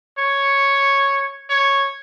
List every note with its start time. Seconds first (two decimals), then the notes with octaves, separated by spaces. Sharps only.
0.19 C#5
1.50 C#5